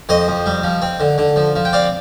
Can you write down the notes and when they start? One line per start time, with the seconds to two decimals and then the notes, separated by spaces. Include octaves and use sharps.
0.09 F2 C5 D#5
0.28 F2
0.46 G3
0.64 F3
0.82 C4
1.00 D3
1.18 D3
1.36 F3
1.56 F3
1.65 G5
1.73 C4 D5 F5